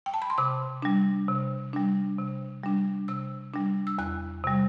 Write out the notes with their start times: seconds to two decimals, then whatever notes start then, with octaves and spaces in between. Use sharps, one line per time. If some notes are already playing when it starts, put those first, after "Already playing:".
0.06 G5
0.14 A5
0.22 B5
0.30 C6
0.38 C3 D6
0.82 G3 D4
1.28 C3
1.73 G3 D4
2.18 C3
2.63 G3 D4
3.08 C3 E6
3.54 G3 D4
3.87 E6
3.98 E2 F#6
4.44 C3 G3